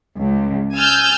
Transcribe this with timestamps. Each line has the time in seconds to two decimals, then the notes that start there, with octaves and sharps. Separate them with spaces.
0.21 C#2
0.76 G#5 E6 F6 G6 A6